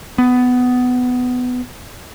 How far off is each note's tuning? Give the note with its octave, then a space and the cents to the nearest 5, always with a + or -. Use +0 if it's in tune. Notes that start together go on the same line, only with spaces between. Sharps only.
B3 +15